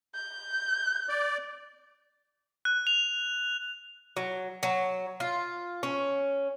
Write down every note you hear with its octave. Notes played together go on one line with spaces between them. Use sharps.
G6
D5
F#6
F7
F#3
F#3
F4
C#4